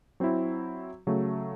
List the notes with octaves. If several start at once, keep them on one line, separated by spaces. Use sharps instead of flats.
F#3 C4 E4
C#3 F#3 A3